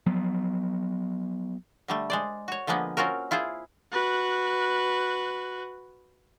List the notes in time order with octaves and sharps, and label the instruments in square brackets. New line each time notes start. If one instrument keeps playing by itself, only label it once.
[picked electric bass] F3 F#3 B3
[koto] D3 G3 A3
G#3 C5 D5
F#4 C#5
D3 F3 G#3 A#3 B3
C4 C#4 F4 F#4 A#4
E4 F4 G#4 C5
[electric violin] F#4 B4